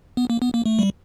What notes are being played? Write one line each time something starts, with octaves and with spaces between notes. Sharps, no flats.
B3
A#3
B3
A#3
A3
G3